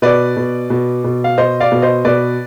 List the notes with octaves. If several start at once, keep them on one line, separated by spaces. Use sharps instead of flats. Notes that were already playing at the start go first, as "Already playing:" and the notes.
B2 B4 D5
B2
B2
B2
F5
B2 C5 D#5
D5 F5
B2
C5 D#5
B2 B4 D5